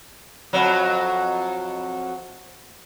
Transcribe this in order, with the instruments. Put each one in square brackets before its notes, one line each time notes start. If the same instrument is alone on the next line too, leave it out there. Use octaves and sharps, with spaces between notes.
[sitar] F2 F#3